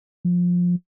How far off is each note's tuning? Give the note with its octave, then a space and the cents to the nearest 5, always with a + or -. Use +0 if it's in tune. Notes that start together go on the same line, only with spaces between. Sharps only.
F3 +20